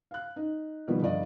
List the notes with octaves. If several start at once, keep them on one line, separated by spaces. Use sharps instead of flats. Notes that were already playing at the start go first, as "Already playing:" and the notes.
F5 F#6
D#4
B2 D#3 F3 G3 A#3 B3
G1 F3 D5 D#5